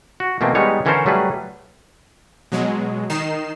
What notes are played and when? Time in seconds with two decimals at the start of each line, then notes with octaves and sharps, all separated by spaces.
0.20 F#4
0.41 B2 E3 A3 A#3 C4
0.55 G3 G#3 B3 D#4 C#5
0.85 D3 E3 C#4 A4 A#4 C5
1.06 F#3 G3 A3 G#4 B4
2.52 B2 F#3 G#3
3.10 D#3 D#4 C7 E7